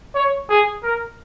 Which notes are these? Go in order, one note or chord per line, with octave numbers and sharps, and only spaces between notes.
C#5
G#4
A#4